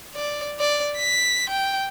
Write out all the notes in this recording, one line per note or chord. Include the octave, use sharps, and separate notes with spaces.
D5
D5
B6
G5